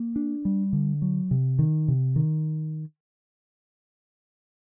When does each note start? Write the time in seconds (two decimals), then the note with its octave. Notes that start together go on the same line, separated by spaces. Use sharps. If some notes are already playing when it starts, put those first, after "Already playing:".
Already playing: A#3
0.16 D4
0.45 G3
0.73 D3
1.02 F#3
1.31 C3
1.59 D#3
1.88 C3
2.16 D#3